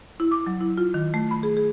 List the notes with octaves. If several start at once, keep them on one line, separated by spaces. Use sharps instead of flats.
E4
D6
F#3
E4
F4
D#3
A3
B5
G#4
G#4